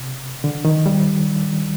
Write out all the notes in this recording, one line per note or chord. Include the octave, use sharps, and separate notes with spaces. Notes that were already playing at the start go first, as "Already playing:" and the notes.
Already playing: C3
D3
D#3
G3